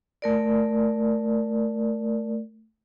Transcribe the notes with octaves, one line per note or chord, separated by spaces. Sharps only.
A3 A#4 D5